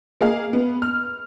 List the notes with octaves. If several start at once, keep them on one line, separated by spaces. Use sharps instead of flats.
A#3 G#4 F5
B3
F6